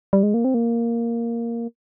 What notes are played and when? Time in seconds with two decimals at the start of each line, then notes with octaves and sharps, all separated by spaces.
0.13 G3
0.23 G#3
0.34 A#3
0.44 C4
0.54 A#3